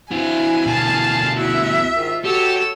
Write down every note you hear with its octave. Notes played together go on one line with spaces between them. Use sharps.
E3 C4 E4 F#4 F5 G#5
D2 B2 F5 A5
E4 F#4 E5
G#2 D#3 D#4 F4
F#4 G4 A4 C#5 E6